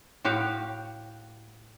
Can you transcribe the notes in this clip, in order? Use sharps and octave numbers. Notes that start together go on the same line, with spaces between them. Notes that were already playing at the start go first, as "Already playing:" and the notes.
A2 F#4 G4 F5